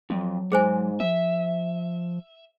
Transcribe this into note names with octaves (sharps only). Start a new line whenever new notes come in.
F2 F#3
G#2 G#4 C5 G#5
F3 E5